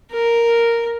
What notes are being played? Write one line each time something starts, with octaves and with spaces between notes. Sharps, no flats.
A#4